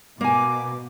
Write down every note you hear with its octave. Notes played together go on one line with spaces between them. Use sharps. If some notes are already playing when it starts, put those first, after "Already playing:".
B2 A#3 G#5 D6